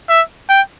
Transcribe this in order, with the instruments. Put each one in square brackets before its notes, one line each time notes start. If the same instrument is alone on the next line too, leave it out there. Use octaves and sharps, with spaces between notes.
[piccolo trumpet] E5
G5